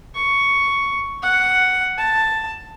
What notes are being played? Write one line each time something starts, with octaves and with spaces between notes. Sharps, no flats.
C#6
F#5
A5